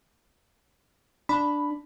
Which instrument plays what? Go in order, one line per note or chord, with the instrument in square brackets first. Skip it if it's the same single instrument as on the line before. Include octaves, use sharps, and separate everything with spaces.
[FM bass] D4 [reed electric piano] B5